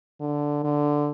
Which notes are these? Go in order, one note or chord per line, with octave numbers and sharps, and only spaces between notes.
D3
D3